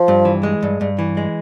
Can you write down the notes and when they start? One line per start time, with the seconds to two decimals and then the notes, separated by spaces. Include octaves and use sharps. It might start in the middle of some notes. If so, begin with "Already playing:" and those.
Already playing: F3
0.08 G2
0.25 E3
0.43 G#3
0.63 G2
0.81 G2
0.99 E3
1.17 G#3